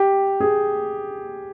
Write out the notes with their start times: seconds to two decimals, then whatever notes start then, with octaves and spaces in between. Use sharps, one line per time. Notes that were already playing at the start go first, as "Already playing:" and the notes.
Already playing: G4
0.40 G#4